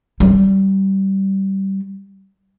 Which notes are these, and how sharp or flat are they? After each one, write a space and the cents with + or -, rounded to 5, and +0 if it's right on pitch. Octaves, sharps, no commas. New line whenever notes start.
G3 -20